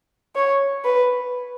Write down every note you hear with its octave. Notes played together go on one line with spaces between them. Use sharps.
C#5
B4